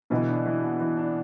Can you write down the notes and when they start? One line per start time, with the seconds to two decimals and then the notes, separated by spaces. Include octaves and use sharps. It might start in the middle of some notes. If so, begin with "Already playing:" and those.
0.10 B2 D3 E3
0.28 D4
0.46 E3
0.63 B3
0.80 E3
0.97 D4